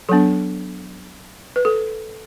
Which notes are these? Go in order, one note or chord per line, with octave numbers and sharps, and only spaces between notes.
F#3 B3 D4 A4
B4
A4